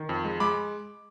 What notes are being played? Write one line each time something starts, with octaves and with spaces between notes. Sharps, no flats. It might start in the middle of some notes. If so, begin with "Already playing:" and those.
Already playing: D#3
F2
G#3
G#3 B5 D6